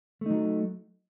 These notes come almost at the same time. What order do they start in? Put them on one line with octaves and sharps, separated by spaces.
A3 D#4 F#3